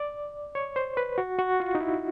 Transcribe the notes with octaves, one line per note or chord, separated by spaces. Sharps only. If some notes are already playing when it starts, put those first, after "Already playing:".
Already playing: D5
C#5
C5
B4
F#4
F#4
F4
D#4
E4